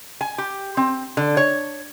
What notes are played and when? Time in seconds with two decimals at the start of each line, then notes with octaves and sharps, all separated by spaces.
0.21 G#5
0.38 G4
0.77 C4
1.17 D3
1.37 C#5